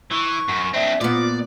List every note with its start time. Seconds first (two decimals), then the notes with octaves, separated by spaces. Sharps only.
0.12 E3 C#6
0.49 F#2
0.74 C4 D4 E5
1.01 A#2 B3 F4 D5